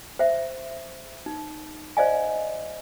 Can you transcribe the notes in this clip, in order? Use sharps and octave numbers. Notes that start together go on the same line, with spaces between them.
C5 E5
D#4
C5 D5 D#5 F5 G#5